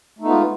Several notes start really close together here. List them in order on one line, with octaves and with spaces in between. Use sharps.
A3 D#4 B3 F4 G#3